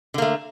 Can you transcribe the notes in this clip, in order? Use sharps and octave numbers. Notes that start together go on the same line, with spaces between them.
D3 A3 A#3